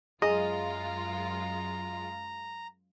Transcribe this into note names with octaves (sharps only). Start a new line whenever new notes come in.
F#2 G#3 F4 G#4 D#5 A#5